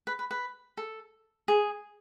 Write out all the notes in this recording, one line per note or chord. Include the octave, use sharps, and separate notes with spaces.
B4
B4
B4
A4
G#4